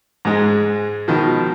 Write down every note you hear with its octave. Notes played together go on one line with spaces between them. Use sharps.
G#2 G#3
B2 D#3 F3